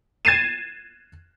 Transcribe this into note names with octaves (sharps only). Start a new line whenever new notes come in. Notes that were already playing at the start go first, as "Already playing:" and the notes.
G#6 A6 C7 D#7 E7